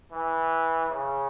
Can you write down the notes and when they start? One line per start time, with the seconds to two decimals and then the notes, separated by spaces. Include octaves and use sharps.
0.12 E3
0.89 C#3